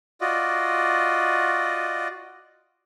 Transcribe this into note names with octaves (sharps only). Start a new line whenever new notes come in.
F4 F#4 D5 D#5